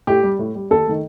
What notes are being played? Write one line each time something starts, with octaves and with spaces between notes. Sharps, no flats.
A2 G4
G3
A2
G3
D#2 A4
D#3 A3